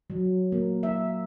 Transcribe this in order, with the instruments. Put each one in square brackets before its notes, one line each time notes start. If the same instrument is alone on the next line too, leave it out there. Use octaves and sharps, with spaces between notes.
[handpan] F#3
A#3
E5